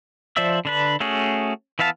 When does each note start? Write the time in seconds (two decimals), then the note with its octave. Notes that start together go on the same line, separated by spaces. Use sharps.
0.37 F3 C5 D5 E5 E6
0.65 D3 D4 B4
1.00 A3 C#4 F#4 G#4
1.79 E3 B3 E5 F5 A5